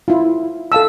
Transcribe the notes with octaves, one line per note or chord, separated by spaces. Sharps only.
E4 F4
A4 F5 A5 E6